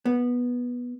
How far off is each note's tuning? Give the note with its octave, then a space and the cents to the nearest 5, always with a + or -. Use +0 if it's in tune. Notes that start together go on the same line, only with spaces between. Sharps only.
B3 -10